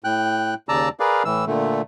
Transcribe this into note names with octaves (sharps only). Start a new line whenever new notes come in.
A2 G5 F#6
D#2 C#3 D5 A5 A#5 E6
G#4 A#4 B4 D5 F5
A2 E3 E6
A#2 D3 A3